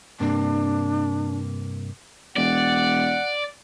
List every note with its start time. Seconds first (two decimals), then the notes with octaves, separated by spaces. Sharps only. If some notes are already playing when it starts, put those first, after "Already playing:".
0.20 G2 C3 A#3 D4
2.36 E1 D5 F#5